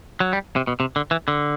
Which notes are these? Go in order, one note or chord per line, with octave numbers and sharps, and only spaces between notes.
F#3
G3
C3
B2
C3
D3
E3
D3